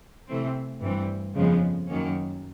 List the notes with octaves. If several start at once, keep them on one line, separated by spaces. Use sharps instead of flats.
C3 E3 A3 C4
G2 E3 G3 C4
F2 C#3 F3 G#3 B3
F#2 D#3 F#3 A#3 C#4